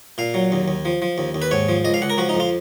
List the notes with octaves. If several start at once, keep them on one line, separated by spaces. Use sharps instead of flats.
A#2 F5
F#3
D#2
D#2
F3
F3
D#2
D#2
B4
G#2 C#5
F3
C#2 D#5
F5
C#2 F#5
A#4
F3 F#4
D#4
F2
F4